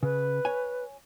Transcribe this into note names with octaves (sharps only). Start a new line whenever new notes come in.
C#3 B4
C#5 G#5